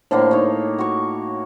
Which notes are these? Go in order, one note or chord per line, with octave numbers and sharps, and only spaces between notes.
A2 D3 F3 A#3
D#4 C#5
F#4 C#6